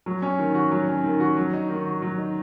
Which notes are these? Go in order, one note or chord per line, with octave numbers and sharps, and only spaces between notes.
F#3
C#4
D#3
F#4
F#3
C#4
D#3
F#4
F#3
D#4
D#3
F#4
F#3
D#4